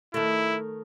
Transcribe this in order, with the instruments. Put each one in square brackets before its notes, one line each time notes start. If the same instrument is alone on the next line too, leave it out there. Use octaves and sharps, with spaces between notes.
[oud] D#3 A3 [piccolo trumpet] E4